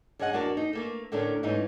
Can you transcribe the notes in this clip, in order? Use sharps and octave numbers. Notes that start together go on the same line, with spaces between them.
G2 C#4 G#4 D#5 F#5
E2 D4 F#4 A#4 F#5 A5
D#4
A3 A#3 A4
A2 D3 A3 C#4 D4 A#4
G#2 E3 A3 C#4 D#4